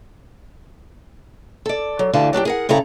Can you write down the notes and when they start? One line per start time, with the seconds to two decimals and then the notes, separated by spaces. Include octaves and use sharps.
1.66 A4 D5
1.99 F#3
2.13 D2 D3 E3 G3 F5 A5
2.33 F#3 D4 F#4 G4
2.45 G#4 A#4 F#5
2.69 G2 C#3 E4 A4 A#5